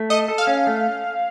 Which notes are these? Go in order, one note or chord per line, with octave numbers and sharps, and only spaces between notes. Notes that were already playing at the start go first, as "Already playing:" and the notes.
Already playing: A3
A4 D#5
A4
F5
C#4
A3